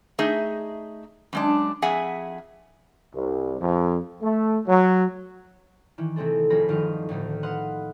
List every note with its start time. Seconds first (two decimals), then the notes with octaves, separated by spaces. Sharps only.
0.19 A3 D#4 G#4 D#5 E5
1.33 F#2 G#3 D4
1.82 F2 G#4 E5 F#5 G#5
3.14 C2
3.60 F2
4.23 A3
4.66 F#3
5.98 D#3 E3
6.16 C3 A3 C4 G#4 A4
6.50 F1 D#4 F4 G#4 B5 A#6
6.69 G1 D#3 F3 D#5 F5
7.09 D2 A2 A#3 D#4
7.43 B4 D#5 F5 F#5 C6